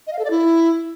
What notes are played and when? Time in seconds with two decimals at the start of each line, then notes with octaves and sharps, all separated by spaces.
0.07 D#5
0.13 F5
0.19 A4
0.25 D5
0.30 E4